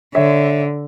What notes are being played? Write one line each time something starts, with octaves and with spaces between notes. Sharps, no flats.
D3 C#5 E5